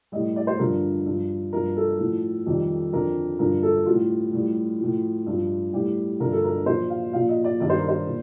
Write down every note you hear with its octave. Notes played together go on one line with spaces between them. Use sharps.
A2 G3 D#5
D5
C5
G2 D3 F3 A#4
G2 F3
G2 F3 A#4
A4
A2 F3
F2 D#3 G3
F2 D3 F3 A#4
G2 D3 F3 A#4
A4
A2 G3 F4
A2 G3
A2 F3
G2 F3
A2 G3 G4
G2 D3 F3 A#4
A4
A#4
A#2 F3 C5
F5
A#2 F3 F5
D#5
D5
G2 D#3 G3 D5
C5
A#4
C5
A#2